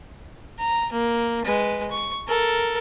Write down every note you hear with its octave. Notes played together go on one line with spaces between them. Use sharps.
A#5
A#3
G#3 B4
C#6
A4 A#4